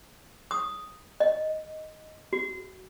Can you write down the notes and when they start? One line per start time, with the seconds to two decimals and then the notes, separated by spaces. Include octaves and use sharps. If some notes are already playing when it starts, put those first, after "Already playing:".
0.51 D#6
1.20 D#5
2.33 F#4